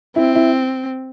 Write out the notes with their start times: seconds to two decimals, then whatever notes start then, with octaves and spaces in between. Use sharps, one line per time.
0.16 C4 E4
0.35 E4